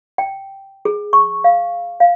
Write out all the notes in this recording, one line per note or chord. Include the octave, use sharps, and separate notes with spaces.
G5
G#4
C#6
F5
F5